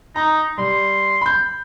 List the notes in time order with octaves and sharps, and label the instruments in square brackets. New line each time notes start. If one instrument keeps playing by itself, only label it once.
[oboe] D#4 [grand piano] A#5
[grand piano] G3 [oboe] C6
[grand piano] B5 G6